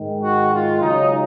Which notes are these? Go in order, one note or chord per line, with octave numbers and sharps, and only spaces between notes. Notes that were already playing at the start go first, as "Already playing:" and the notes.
Already playing: G#2 D#3 G#3
F#4
F4
C#2 C#3 F#3 D#4